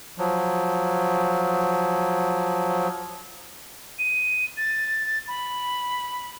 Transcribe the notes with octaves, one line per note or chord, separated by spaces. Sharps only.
F3 F#3
D#7
A6
B5